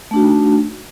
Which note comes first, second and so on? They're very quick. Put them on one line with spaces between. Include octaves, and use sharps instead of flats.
A3 D4 F#4 D#4